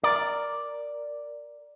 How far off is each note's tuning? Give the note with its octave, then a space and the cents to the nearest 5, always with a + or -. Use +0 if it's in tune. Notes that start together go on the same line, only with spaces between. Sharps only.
A#4 +0 D5 +0